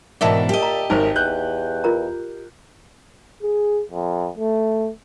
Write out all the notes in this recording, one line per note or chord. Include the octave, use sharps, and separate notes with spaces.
G#2 B2 D#3 E3 D5 E5 A5
A#2 G4 D#5
A#5
G#1 F#2 D#4 A#4 C5
E2 F#6 G6
F4 A#4 A#5
G#4
F2
A3